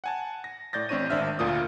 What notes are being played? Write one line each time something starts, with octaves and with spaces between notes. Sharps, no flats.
F#5 G#5 A5
A#6
A2 D5 G6 A6 A#6
A1 C4 D4 C#5 D#7
G#1 D4 C5 E5 F6
D2 A#2 A#3 F4 D#6